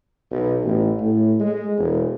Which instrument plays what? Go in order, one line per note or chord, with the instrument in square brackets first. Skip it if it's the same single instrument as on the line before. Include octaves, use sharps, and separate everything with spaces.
[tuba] B1
A1
A2
G#3
E1